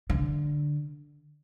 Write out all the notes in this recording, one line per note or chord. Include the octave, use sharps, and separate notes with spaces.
D3